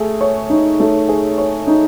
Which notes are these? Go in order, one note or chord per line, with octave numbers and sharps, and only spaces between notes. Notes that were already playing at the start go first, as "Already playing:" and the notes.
Already playing: A3 G#4
C#5
D#4
A3
G#4
C#5
D#4